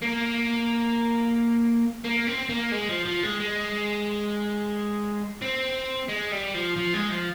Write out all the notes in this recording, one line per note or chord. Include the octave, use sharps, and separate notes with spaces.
A#3
A#3
C4
A#3
G#3
F3
F3
G#3
G#3
C4
G#3
G3
F3
F3
G#3
F3